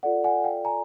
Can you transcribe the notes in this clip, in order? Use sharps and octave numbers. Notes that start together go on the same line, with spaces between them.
F4 A4 D5 F#5
F#5 G#5
F5 G5
G#5 A#5